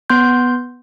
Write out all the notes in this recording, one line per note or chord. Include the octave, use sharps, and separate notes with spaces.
B3 C6 G6